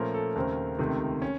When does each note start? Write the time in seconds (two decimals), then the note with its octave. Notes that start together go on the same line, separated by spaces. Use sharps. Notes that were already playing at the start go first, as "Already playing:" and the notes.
Already playing: A#2 F3 A3 C#4 A#4
0.14 A4
0.36 D#2 C#3 A3 C4 A#4
0.79 C#2 C3 D#3 A3
1.22 C#4